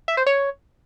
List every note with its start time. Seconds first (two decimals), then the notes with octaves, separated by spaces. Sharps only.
0.08 E5
0.17 C5
0.26 C#5